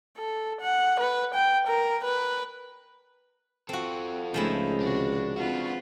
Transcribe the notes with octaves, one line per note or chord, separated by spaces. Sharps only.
A4
F#5
B4
G5
A#4
B4
C4 F4 F#4 A4
C#2 F3 G#3 A3 D#4 E4
C3 D#3 D4 F#4
C4 D4 F4 F#4 B4